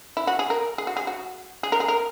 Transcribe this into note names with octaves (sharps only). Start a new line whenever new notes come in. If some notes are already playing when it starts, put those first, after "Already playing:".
E4
F#4
G#4
A#4
G#4
F#4
G#4
F#4
G#4
A#4
G#4
A#4